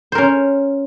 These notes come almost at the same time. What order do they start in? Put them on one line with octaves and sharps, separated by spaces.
C5 A#4 C#4